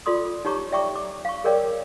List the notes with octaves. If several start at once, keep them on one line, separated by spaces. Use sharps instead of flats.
F4 A4 D5 C6 D#6
D#4 G4 C#5 A#5 C#6 D6
D5 E5 G5 A#5 C#6 D6
D6
F5 C#6
G#4 A#4 C#5 D5 G5 D6